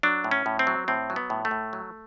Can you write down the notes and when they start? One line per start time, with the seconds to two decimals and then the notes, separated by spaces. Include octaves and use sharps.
0.03 F#3 D4
0.24 A2
0.31 C#4
0.46 A2
0.59 C4
0.67 F#3
0.88 A2 C4
1.10 F#3
1.16 B3
1.30 A2
1.45 A3
1.51 A2
1.73 F#3